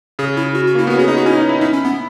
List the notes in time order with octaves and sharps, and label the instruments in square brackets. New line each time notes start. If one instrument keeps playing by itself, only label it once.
[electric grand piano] C#3 [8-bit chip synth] G#4
[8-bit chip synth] E4
F#4
F#4
[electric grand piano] A#3 [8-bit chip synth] E4
[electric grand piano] B3 [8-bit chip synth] F#4
[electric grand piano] C#4 [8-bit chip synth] G#4
[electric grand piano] D#4 [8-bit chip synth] G#4
[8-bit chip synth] F#4
[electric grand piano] C#4 [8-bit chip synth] E4
[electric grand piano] D#4
E4
[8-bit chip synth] D#4 [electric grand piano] E4
[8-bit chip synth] C#4
B3